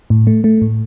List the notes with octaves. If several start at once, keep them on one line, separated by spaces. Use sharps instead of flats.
A2
A3
A3
A2